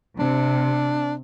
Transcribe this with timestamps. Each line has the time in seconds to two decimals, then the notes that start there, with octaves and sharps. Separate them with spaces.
0.19 C3 D4